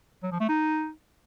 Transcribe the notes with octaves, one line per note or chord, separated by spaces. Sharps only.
F#3
F3
A3
D#4